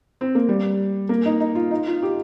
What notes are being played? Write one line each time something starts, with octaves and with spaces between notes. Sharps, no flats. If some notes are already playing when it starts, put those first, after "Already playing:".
C4
A#3
G3
A#3
D#4
D#4
F4
D#4
F4
G4